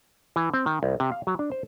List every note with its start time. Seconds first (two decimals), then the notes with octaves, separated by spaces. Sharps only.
0.36 E3
0.54 C4
0.66 D#3
0.83 C2
1.00 C3
1.12 F5
1.27 F#3
1.39 D4
1.52 C5